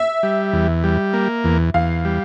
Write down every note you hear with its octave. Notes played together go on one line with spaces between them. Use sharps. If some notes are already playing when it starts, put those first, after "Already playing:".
Already playing: E5
G3
E2
G3
A#3
E2
E2 F5
G3